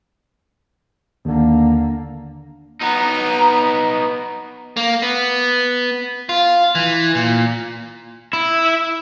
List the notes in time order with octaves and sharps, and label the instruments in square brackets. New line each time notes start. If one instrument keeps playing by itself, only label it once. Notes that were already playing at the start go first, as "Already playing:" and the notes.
[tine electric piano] D#2 [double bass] D3 A#3
[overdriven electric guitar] B3 D#4 [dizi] A#5
[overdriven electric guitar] A#3
B3
F4
E3
A#2
[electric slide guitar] E4